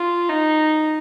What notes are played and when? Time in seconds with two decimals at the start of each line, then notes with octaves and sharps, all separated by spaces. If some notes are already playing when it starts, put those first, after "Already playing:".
Already playing: F4
0.29 D#4